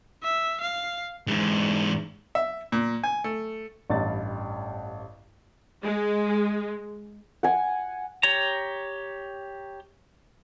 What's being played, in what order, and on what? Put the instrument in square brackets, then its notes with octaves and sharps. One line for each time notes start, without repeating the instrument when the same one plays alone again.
[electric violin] E5
F5
[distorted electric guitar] G#2 E3
[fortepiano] E5
A#2
G#5
A3
[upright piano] A1 G2 G3 D#5 A6
[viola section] G#3
[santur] F#5 G#5
[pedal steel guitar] G4 C#5 A#5